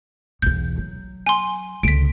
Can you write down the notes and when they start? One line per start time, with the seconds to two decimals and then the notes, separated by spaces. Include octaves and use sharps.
0.42 B1 E2 G6
0.78 F#3
1.26 G#5 C6
1.83 C#2 D3 B6 D7